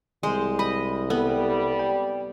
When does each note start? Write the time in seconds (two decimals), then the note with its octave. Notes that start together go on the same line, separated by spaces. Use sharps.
0.23 C2 G#3 C5
0.59 D#5 B5
1.10 G3 B3 A4
1.79 G5